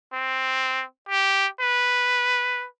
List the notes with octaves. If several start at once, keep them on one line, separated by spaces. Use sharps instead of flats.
C4
G4
B4